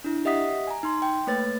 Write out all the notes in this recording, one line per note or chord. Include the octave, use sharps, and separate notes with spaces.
D4 E4
G4 D#5 E5 F#5 D#6 B6
G#5 A#5
D#4 C6
G5
A3 A#3 B4 C#5 A6